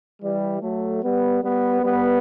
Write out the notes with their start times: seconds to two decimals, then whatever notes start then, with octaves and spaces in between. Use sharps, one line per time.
0.21 E3 G3
0.61 F#3 A3
1.01 G3 B3
1.42 G3 B3
1.82 G3 B3